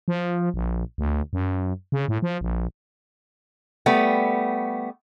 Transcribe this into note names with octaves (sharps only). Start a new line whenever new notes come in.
F3
A#1
D2
F#2
C#3
A2
F3
A#1
G3 A3 B3